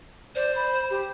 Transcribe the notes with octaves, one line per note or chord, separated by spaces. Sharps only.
C5 D5
B5
G4